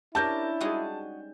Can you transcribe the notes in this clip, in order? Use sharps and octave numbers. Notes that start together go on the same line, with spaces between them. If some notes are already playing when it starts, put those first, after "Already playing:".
C#4 D4 E4 G4 A#4 A5 G6
G3 G#3 D#4 F#4 G#4